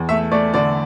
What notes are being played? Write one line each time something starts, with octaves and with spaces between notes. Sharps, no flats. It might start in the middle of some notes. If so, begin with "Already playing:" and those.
Already playing: E2
A3 E5
A3 D5
D3 D5